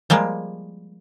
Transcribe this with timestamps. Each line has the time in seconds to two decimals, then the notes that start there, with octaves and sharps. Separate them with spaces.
0.10 F3 G3 G#3 A#3